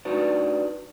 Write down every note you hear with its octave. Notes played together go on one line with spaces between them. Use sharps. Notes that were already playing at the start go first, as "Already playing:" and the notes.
D4 D#4 F#4 B4 D5